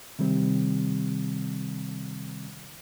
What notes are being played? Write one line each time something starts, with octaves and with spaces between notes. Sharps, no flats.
C3 D#3 G3 C4